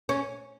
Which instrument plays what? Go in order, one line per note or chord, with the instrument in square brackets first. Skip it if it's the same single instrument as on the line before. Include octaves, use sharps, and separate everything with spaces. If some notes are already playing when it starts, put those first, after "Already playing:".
[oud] C#4